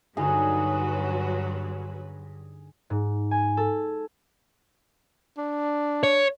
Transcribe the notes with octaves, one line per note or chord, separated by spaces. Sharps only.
G2 D3 F#3 D#4 F#4 G#4 B4
G#2
G#5
A4
D4
C#5